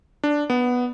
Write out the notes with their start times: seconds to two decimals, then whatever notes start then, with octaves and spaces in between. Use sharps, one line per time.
0.24 D4
0.50 B3